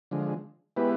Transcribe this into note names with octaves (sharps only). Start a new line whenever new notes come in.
D3 F3 G#3
G#3 B3 E4 G4 B4